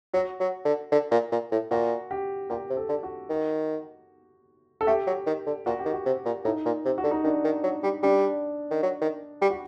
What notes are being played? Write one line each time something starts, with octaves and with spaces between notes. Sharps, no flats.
F#3 F#4
F#3
D3
D3
A#2
A#2
A2
A#2 F#4
G4
A#2 G4
C3
A4
D3
F#4
D#3
A4
A3 G4
F#3
D#3
D3
A#2 F#4
G4
D#3
F#4
C3
A#2
A2 D#4
A#2
C3 G4
F#4
D3
D#4
D#3 D4
D#3
F#3
G3
G3 D4
D#3
F#3
D#3
G3
F#4